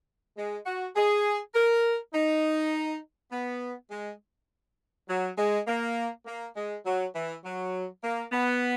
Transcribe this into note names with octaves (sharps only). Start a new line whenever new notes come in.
G#3
F#4
G#4
A#4
D#4
B3
G#3
F#3
G#3
A#3
A#3
G#3
F#3
E3
F#3
A#3
B3